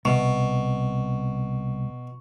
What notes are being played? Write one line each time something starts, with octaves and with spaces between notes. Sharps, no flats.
C2 B2 C#6